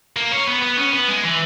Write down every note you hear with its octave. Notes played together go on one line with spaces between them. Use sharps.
A#3
C#4
B3
B3
C#4
B3
G#3
E3